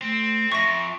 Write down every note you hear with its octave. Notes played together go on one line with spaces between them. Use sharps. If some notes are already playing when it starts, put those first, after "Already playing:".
A3 C4
F2 G#2 E5 C#6 A#6